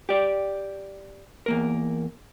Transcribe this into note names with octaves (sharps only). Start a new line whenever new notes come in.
G4 D5
E2 A#3 A#4